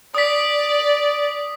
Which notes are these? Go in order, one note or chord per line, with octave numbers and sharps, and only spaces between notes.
D5 D#6 B6